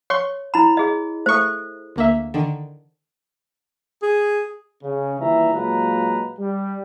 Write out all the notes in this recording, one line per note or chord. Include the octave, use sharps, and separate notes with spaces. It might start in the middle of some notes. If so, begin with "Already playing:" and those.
C#5 C6 C#6
E4 B5 E7
G#4 D#5
A3 A4 C5 C#6
D2 A#3 E5
D3 D#3
G#4
C#3
D#2 A#2 E3 G3 E5 A#5
A#2 F#3 G#3 F4 B4 A#5
G3